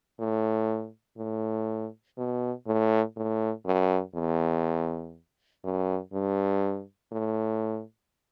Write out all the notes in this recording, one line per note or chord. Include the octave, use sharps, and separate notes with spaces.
A2
A2
B2
A2
A2
F#2
E2
F#2
G2
A2